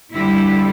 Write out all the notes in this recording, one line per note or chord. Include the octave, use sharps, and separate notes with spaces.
F2 D3 G3 E4